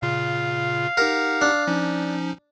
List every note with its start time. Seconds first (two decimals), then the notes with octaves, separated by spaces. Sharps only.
0.02 A#2 C#3 F4 F5
0.97 D#4 G4 A#4 F#5
1.41 D4
1.67 F3 C#4 D#4